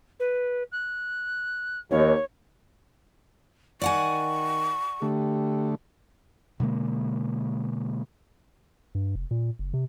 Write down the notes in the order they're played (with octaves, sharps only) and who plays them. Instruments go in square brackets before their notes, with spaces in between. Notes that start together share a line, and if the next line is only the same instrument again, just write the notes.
[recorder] B4
F#6
[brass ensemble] D#2 [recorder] C#5
[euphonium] D#3 [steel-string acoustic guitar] D5 F#5 G#5 [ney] C#6
[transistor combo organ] D3 A3 [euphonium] G4
[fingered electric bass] B2 D3 G#3 A#3
[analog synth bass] G2
F1
A#2
F#1
C3